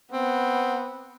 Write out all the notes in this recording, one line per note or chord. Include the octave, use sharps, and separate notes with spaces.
B3 C4